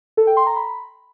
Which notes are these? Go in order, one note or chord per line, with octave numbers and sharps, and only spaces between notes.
A4
G5
C6
A#5
B5